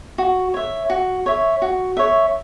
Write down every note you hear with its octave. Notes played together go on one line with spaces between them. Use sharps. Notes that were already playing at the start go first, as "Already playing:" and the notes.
F#4
C#5 E5
F#4
C#5 E5
F#4
C#5 E5